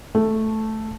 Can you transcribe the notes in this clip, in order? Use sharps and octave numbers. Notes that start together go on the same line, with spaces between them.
A3